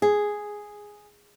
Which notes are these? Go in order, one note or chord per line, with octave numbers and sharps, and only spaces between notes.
G#4